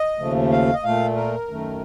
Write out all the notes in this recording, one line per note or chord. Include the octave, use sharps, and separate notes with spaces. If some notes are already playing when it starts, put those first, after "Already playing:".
Already playing: D#5
D#2 C#3 F3 A3
F5
D#5
A#2 A3 F5
A#4
F#2 D#3 A3